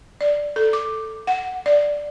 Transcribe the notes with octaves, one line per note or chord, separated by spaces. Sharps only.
D5
A4
D6
F#5
D5